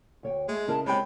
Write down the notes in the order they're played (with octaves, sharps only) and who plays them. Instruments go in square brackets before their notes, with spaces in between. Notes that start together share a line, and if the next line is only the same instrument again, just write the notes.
[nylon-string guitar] D2 C#5 G5
[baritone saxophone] G#3 [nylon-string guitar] A3 [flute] E5
[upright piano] C#3 [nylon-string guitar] E4 A#4 D#5 [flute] A5
[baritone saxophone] C3 [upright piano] G#3 G5 [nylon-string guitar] C#5 G#5 [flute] B5